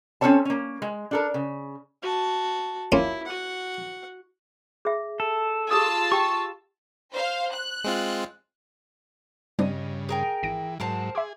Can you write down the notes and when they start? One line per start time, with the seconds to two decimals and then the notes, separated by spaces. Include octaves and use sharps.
0.21 C4 C#4 F#4 A4 C#5 A5
0.45 A#3 C#4
0.82 G#3
1.11 D4 A4 A#4
1.34 C#3
2.02 F#4 A5
2.92 A#3 C#4 E4 F4
3.26 F#4 F#5
4.85 G#4 E5
5.20 A4
5.71 F4 G4 G#4 A5 D#6 E6
6.12 G4 G5 C#6
7.13 C5 F5
7.54 F#6
7.84 G#3 C4 F4
9.59 G2 C#3 G3 C4 D4 D#5
10.09 G#4 A#4 G5
10.43 G#1 E3 A#6 D7
10.80 G#2 F#3 A#4 C5 A5
11.15 G#4 E5 C6 D6